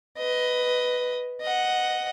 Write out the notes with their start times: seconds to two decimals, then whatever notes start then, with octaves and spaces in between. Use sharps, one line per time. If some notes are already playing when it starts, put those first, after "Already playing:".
0.18 B4 D#5
1.42 D#5 F#5